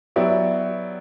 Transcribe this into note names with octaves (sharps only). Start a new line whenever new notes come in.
F#3 B3 E4 G4 D5